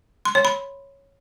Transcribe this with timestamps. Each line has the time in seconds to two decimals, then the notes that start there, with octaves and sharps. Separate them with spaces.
0.25 C6
0.35 C#5
0.45 B5